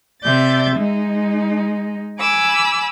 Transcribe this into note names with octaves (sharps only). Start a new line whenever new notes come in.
C3 D5 E5 G6 A6
G#3 D#4
G#5 B5 D6 E6